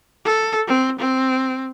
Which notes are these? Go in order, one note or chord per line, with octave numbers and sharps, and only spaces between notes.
A4
C4
C4